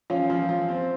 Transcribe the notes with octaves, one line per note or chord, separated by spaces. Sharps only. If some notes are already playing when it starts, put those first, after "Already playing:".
F3 C#4 F4
F3
F3
C4